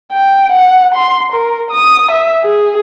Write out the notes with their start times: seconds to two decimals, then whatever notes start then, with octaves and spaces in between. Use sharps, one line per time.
0.12 G5
0.52 F#5
0.95 C6
1.32 A#4
1.71 D#6
2.12 E5
2.44 G#4